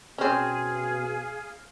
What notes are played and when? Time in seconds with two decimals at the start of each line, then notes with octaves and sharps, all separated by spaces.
0.18 B2 C4 C#4 G#4 F5